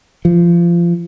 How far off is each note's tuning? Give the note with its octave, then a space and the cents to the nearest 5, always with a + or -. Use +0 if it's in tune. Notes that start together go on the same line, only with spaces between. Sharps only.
F3 -25